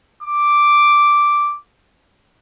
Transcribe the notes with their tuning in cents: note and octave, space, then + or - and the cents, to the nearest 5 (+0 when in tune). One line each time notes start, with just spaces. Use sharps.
D6 +0